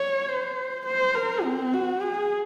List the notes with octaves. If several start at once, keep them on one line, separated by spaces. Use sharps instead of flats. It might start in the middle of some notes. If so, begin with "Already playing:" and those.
Already playing: C#5
C5
C5
A#4
C4
F#4
G#4